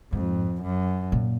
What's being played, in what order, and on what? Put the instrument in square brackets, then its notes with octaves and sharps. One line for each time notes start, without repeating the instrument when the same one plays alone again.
[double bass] F2 [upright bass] G#2
[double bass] F#2
[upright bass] A#2